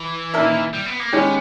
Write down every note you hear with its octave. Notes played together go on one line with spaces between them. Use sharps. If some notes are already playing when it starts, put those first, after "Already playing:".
Already playing: E3
D#3 A#3 E4 A#4 E5
G3
B3
A#3
D#3 G#3 B3 C#4 G4